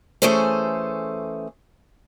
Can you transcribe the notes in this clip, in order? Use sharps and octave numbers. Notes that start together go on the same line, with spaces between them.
E3 A3 C#4 G#4 A4 C5